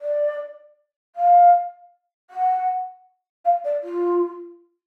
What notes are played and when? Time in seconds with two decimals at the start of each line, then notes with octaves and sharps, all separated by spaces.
0.01 D5
1.16 F5
2.30 F#5
3.45 F5
3.64 D5
3.83 F4